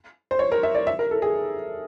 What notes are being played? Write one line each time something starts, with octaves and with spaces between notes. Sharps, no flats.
C5
C#5
A#4
E5
D5
E5
A#4
A4
G#4